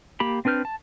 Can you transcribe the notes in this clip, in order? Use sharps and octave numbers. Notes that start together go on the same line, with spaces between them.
A#3 G4 B5
C4 D4 B4 F6 G6
A5